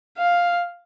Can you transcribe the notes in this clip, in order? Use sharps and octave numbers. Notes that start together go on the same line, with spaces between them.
F5